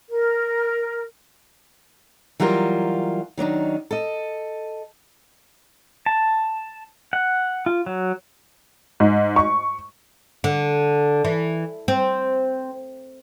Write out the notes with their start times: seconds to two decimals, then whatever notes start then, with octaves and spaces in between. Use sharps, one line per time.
0.10 A#4
2.40 E3 F#3 G3 F4 A#4
3.37 D#3 F#3 D4 D#4
3.91 A4 D#5
6.06 A5
7.13 F#5
7.66 F4
7.86 F#3
9.00 G#2
9.36 C#6
10.44 D3
11.25 E3
11.88 C4